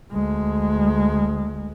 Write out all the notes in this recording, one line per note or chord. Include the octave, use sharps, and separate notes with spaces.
D2 G#3